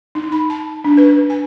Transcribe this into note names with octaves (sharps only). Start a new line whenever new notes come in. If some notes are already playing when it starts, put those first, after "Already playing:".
D#4
B5
A5
D4
B4
G#5